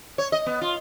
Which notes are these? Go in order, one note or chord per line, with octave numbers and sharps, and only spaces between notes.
C#5
D#5
B3
F4